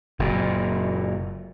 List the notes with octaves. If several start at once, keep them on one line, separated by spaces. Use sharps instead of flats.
F#1 A#2